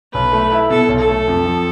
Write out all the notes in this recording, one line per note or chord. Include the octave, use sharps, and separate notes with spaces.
B1 B4
A3
E4
B2 A4
B1
A4
A3
F2
F3